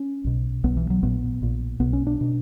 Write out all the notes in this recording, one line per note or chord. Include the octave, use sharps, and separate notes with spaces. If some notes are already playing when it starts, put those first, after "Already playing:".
Already playing: C#4
B1 B2
B1 B2 B3
E3
F#3
A#1 A#2 B3
A#1 A#2
B1 B2 B3
C#4
D4
B2